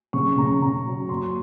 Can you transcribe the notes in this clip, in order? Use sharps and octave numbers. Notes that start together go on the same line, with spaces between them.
C#3 C#6
C#3 A#5
C#3 A#5
F#3
F#1 C6